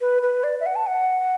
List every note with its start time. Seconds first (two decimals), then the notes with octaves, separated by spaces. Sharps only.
0.01 B4
0.23 B4
0.44 D5
0.60 E5
0.66 F#5
0.76 A5
0.87 F#5